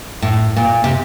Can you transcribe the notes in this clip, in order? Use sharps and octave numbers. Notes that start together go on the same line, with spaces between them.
A2
A#2
C3